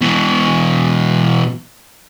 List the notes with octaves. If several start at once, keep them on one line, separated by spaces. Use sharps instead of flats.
B2 E3